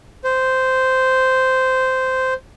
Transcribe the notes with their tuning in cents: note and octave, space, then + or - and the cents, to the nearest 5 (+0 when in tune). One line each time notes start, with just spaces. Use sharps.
C5 -10